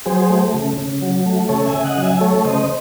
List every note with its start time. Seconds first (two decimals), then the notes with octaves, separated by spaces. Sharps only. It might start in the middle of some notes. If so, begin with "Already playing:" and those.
0.06 F#3 G#4 C5
0.30 A3
0.54 C#3
0.77 C#3
1.02 F#3
1.26 A3
1.49 C#3 A4 C#5
1.67 E5 G#5
1.74 C#3
1.84 D#5 F#5
1.97 F#3
2.03 E5 G#5
2.21 A3 A4 C#5
2.45 C#3 C5 D#5